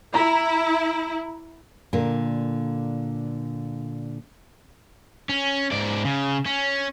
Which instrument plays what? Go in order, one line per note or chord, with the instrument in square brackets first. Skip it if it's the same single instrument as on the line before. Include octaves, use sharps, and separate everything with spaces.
[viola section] E4 [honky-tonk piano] A#5
[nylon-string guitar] A#2 D3 A#4
[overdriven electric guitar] C#4
G#2 D5
C#3
C#4